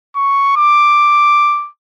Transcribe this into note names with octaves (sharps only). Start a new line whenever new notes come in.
C#6
D6